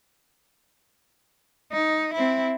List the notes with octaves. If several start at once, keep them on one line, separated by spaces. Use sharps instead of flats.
D#4
C4 E4